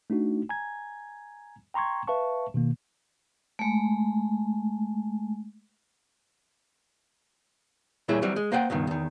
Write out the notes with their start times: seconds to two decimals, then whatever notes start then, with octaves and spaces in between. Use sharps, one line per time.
0.10 A3 D4 D#4 F#4
0.49 G#5 A#5 G#6
1.74 G5 A#5 C6 C#6 G#6
2.08 B4 E5 F5 A5 C#6
2.54 B2 D#3 A#3
3.59 G#3 A3
8.08 A#2 E3 G3 E4 G#4 C#5
8.22 E3 F#3 G3 C4
8.36 G#3
8.52 A#3 C5 F#5 G5
8.70 C#2 G2 B2 D#3
8.87 E2 D#3